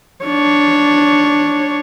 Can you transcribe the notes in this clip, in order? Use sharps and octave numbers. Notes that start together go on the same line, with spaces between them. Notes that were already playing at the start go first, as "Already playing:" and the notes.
D4 C#5